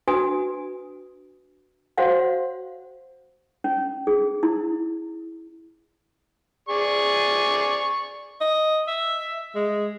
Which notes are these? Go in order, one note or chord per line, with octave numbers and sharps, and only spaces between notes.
D4 F#4 B4 G#5 D#6
F#4 C5 C#5 F5 F#5
C#4
G#4
E4
G#4 D5 C#6
D#5
E5
G#3